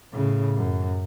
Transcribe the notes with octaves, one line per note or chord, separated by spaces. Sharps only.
A2 C#3
F#2